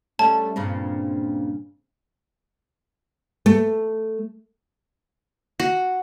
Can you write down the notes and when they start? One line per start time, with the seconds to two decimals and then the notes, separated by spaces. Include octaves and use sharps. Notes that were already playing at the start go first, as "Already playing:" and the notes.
0.19 G3 A3 C#4 A5
0.56 G2 A#2 C#3 C4
3.46 A3
5.60 F#4